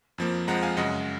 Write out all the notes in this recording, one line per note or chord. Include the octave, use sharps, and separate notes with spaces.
F2 F3 A#3
F2 F3 G#3 F#5 A#5
F5 G#5
F#2 C#3 G#3 D#5 F#5